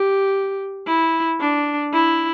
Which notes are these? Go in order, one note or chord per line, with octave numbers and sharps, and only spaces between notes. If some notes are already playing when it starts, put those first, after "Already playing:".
Already playing: G4
E4
D4
E4